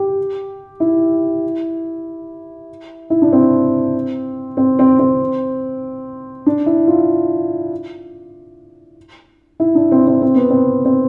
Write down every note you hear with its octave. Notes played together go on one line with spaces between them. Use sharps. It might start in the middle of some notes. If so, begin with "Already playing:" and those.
Already playing: G4
E4
E4
D4
C4
C4
C4
C4
D4
E4
F4
E4
D4
C4
C4
C4
B3
C4
C4